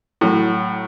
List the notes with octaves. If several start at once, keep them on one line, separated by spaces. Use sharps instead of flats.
A2 F#3